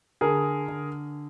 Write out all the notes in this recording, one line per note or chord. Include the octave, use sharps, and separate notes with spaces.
D3 G#4 A#4
D3